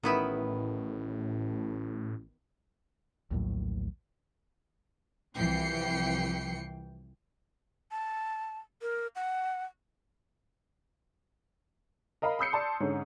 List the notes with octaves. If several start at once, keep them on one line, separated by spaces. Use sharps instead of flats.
A1 A2 D#3 B3 E4
A#1 D#2 A2 F#3
C2 E3 F3 G5 C7 C#7
A5
A#4
F#5
A#4 D#5 F5 B5
B5 D#6 E6 G6 C7 C#7
D5 A5 C6
G#2 D3 C#4